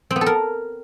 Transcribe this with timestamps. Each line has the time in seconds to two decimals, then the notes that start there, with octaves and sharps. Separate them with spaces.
0.11 C4
0.16 B3
0.21 A4
0.26 A#4